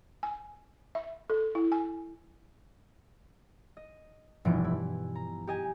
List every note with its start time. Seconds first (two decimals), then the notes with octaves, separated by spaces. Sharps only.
0.23 G#5
0.95 E5
1.30 A4
1.55 E4
1.72 G#5
3.77 D#5
4.45 F1 G2 B2 E3 F3 D7
4.64 E4
5.15 A#5
5.47 G4 D#5 G#5